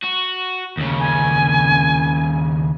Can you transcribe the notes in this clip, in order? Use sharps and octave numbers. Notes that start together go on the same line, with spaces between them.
F#4
D#2 C#3
G#5